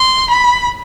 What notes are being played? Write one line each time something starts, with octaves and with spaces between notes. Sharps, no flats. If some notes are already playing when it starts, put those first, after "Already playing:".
Already playing: C6
B5